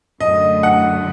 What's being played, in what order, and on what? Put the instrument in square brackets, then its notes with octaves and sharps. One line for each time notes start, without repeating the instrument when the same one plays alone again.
[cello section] F#2 D3 A3 [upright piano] D#5
[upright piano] F#5